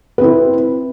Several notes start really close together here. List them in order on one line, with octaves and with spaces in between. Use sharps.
B4 C4 E4